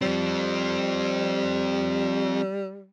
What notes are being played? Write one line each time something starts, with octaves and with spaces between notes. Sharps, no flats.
F3 G3 C4